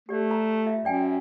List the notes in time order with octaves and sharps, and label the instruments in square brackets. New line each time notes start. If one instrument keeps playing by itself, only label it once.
[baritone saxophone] A3 [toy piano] G4 D5
[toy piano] B4 A#5
F4 E5
[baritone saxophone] F#2 [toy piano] D5 G5 G#5